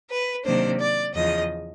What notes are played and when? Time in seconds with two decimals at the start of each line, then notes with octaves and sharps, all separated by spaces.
0.10 B4
0.44 C3 D#3 F#3 A#3 D4 C5
0.80 D5
1.15 E2 C#3 F3 D#5